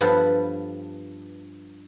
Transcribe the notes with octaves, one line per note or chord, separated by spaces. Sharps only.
G2 F3 B3 A4 B4